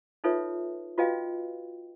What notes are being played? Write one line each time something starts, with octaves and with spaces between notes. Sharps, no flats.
D#4 F4 A4 B4 C#5 E5
F4 F#4 B4 D#5 F5 G5